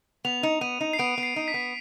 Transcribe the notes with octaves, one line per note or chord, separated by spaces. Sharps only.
B3 F7
D#4
B3 D#7
D#4
C7
B3 D7
B3
C7
D#4
B6
B3